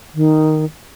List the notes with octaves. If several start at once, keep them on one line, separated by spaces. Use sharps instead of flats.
D#3